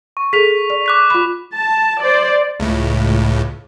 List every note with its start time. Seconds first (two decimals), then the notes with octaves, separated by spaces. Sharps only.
0.17 C#6
0.33 G#4 A4 B6 F7
0.70 D5
0.86 D6 F#6 B6
1.10 F4 B5
1.56 A5
2.02 C5 D5
2.60 C#2 A2